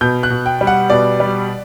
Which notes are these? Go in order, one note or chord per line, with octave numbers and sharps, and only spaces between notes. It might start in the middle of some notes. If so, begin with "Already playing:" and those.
B2 G6
F#6
B2
G5
G3
F#5
B2 D5
G3